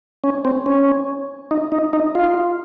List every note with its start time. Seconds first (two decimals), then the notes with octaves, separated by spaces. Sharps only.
0.24 C#4
0.45 C4
0.66 C#4
1.51 D#4
1.72 D#4
1.93 D#4
2.15 F4